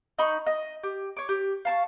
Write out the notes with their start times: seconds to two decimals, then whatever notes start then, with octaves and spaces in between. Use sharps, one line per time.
0.19 D#4 B5 C#6
0.47 D#5
0.83 G4
1.17 C#5 D6
1.29 G4
1.65 F5 A5 C#6